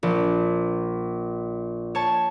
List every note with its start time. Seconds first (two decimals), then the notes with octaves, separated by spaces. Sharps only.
0.03 A#1
1.95 C#5 A5